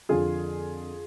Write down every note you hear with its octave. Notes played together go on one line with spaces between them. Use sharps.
F2 D3 F3 F4 G#4